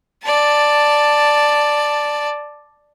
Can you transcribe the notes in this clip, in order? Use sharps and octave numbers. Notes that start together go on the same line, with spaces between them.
D5 A5